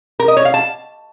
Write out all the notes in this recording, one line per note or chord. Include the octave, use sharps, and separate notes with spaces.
A#4
D#5
C#5
F5
A5